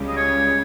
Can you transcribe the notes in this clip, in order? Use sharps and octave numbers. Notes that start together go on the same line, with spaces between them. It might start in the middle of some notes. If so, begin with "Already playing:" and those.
Already playing: C#2 C#3 G3
D#5
C#5